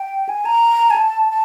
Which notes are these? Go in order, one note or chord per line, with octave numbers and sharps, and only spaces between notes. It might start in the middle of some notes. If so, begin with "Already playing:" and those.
Already playing: G5
G#5
A#5
G#5
A5
A5